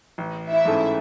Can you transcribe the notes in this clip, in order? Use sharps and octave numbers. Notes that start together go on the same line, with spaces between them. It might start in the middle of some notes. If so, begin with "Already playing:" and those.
A1
E4 E5
G#2 E3 A3 C#4